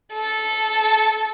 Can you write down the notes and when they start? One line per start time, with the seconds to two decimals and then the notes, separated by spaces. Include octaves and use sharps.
0.14 A4